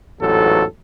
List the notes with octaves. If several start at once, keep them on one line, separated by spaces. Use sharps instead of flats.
A1 E2 G#2 F#3 A4